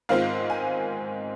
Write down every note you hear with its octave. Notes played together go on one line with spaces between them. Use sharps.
G#2 D#3 G#3 C4 F4 F5
G#5